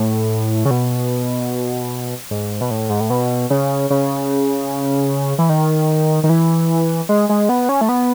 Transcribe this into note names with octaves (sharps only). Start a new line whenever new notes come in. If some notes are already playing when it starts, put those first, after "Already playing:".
Already playing: A2
C#3
B2
G#2
B2
A2
G#2
A2
B2
C#3
C#3
E3
D#3
D#3
E3
G#3
G#3
B3
C#4
A3
B3